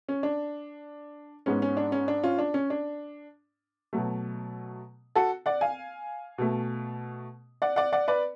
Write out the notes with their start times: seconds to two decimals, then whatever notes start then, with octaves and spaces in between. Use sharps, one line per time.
0.09 C#4
0.23 D4
1.46 G#2 G#3 B3 C#4
1.62 C#4
1.77 D4
1.92 C#4
2.08 D4
2.23 C#4 F4
2.38 D4
2.54 C#4
2.70 D4
3.93 B2 F#3 A3
5.16 F#4 A4
5.46 D5 F#5
5.61 F5 G#5
6.38 B2 A3
7.62 D5 F#5
7.76 D5 F#5
7.93 D5 F#5
8.08 B4 D5